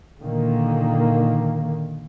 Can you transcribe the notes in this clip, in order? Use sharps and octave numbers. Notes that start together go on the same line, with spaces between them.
A#2 D3 D#3 A#3